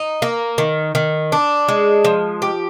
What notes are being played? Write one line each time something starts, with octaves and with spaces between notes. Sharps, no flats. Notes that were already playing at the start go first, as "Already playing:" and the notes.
Already playing: D#4
A#3
D#3
D#3
D4
G#3
F3
G4